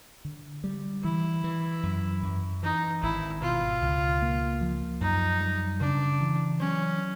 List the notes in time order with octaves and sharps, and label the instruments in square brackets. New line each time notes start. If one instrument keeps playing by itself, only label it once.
[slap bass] D3
G3
[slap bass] E3 [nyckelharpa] E4
[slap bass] E3
F#2
F#2
[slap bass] E3 [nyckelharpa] D#4
[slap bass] G#1 [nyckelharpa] E4
[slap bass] B2 [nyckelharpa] F4
[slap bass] C#2
A#3
F3
[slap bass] F#2 [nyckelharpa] D#4
[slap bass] G3
[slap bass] C#3 [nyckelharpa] D4
[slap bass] E3
[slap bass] F#3 [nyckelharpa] C#4